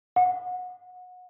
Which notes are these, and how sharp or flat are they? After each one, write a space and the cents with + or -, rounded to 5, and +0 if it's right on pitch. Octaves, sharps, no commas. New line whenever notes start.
F#5 -25